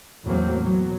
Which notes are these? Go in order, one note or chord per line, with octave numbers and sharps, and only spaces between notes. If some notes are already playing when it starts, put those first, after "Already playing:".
E2 A2 F#3 A#3 C4
B2 F#3